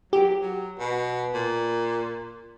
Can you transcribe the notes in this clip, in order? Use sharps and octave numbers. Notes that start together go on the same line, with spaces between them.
F#3 G4
F#3
B2
A#2